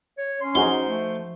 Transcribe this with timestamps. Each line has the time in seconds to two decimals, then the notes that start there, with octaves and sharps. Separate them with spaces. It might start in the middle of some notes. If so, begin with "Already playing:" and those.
0.18 C#5
0.41 C#4 C6
0.55 F3 D#4 F#4 G#4 C6
0.86 A3